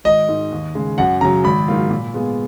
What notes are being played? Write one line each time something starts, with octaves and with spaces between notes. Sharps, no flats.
G#1 D#5
G#2 D#3
D#2
C#3 G#3
F#2 F#5
C#3 F#3 A#5
G#1 B5
G#2 F#3 A#3 F4
A#2
G#3 B3 F4 G#4